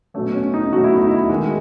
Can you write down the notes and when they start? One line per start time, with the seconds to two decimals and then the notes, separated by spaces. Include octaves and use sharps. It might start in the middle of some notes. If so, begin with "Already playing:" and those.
0.14 B2 F#3 A3 C#4
0.34 C#4
0.54 D#4
0.73 B2 F#3 A3 F#4
0.84 E4
0.95 D#4
1.08 E4
1.29 D#3 G#3 F#4